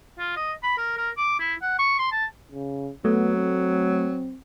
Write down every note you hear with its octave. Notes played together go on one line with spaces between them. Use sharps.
F4
D#5
B5
A#4
A#4
D6
E4
F#5
C#6
C6
A5
C#3
F#3 A3 B3
C4